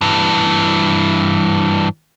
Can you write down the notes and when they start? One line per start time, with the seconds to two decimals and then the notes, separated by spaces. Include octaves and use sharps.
0.01 G2 E3